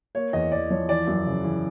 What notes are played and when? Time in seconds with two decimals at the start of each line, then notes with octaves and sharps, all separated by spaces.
0.15 A#3 C#5
0.33 E2 D#5
0.51 E2 D5
0.70 F3 C#5
0.89 E3 D5
1.07 F#2
1.26 C#3
1.44 E3